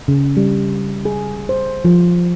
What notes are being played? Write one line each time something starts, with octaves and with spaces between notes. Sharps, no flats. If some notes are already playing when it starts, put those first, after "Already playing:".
C#3
G3
G#4
C5
F3